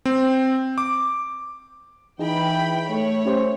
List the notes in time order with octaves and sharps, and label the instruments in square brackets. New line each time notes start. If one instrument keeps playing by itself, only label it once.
[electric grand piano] C4
D6
[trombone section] E3 [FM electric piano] D#4 G#4 [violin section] G5 B5
[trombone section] A3 [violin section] C#5
[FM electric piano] C#4 G4 C5